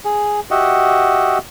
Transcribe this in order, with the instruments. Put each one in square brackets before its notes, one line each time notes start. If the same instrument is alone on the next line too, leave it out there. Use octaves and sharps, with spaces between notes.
[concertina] G#4
F#4 G4 D#5 E5 F#5